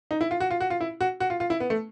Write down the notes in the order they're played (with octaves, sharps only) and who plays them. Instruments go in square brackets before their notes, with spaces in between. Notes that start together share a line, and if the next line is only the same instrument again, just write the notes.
[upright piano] D#4
E4
F4
F#4
F4
F#4
F4
E4
F#4
F#4
F4
F4
E4
B3
A3